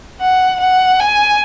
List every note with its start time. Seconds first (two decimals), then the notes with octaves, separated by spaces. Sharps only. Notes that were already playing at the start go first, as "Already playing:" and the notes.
0.21 F#5
0.60 F#5
1.00 G#5